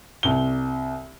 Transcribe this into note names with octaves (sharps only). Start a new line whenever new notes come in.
C2 G7